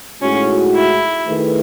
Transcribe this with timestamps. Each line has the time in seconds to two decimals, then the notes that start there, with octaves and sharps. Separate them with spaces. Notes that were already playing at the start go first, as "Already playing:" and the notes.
0.21 A2 G#3 C#4 D#4 F#4
0.74 E4
1.26 D#3 A3 E4 G#4 B4